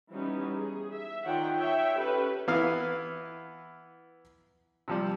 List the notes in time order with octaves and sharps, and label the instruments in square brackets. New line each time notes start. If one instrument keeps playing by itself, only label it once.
[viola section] E3 G3 B3 C#4 D#4
G#4
E5
D#3 F4 C#5 D5 F#5 G5
C#5 E5 G5
C#4 G4 A4 B4
[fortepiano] E3 B3 E4 F5 F6
C3 F3 G3